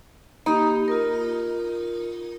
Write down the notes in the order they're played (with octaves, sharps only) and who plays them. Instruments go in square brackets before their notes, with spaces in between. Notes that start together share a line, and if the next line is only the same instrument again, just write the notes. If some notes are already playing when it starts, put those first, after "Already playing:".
[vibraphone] A#3 G4 B5 [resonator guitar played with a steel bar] D#4
[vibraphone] F4 A#4